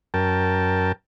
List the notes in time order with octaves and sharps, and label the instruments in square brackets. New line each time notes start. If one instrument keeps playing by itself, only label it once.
[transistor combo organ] F#2 A#4 G5 A5